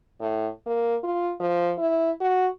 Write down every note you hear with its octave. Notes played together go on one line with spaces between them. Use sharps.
A2
A#3
F4
F3
E4
F#4